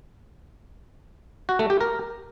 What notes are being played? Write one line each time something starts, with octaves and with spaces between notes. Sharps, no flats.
F#4
A3
G4
A#4